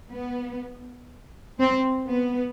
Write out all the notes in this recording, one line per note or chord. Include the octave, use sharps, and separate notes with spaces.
B3
C4
B3